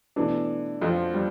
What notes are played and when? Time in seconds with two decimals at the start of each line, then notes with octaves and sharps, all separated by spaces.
0.16 B2 E3 A3 D4
0.82 F2 F3
1.14 G3